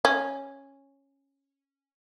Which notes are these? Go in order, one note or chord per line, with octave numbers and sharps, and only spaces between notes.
C#4